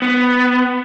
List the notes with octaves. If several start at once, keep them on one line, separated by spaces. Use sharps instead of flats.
B3